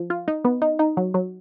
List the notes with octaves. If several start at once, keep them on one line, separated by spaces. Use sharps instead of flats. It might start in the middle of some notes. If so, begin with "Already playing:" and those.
Already playing: F3
F4
D#4
B3
D#4
D#4
F#3
F#3